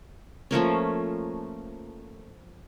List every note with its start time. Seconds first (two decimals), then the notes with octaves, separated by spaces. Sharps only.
0.51 F3 A3 A#3 C#4